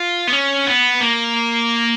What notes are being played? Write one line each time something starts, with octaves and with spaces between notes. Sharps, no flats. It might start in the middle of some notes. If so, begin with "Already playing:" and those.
Already playing: F4
B3
C#4
B3
A#3